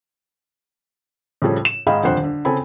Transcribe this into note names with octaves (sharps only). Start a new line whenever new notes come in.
A2 C#3 F3 G3 G#4 A4
E7
G#2 G#4 D#5 F5 G5 B5
D#1 F2 D3 C5 F#5
D3
C#3 C4 A4 G#5 B5